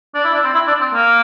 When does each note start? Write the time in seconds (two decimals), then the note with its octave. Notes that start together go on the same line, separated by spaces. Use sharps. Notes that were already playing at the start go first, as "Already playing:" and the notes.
0.15 D4
0.24 E4
0.34 D4
0.44 C4
0.54 E4
0.68 D4
0.81 C4
0.94 A#3